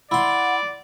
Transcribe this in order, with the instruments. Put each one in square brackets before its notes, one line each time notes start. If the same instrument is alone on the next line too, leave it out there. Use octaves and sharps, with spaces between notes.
[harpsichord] E4 C6 [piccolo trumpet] D5 [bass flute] F#5